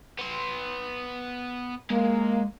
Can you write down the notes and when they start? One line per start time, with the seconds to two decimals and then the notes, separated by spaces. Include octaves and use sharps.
0.19 B3 C6
1.90 G#3 A#3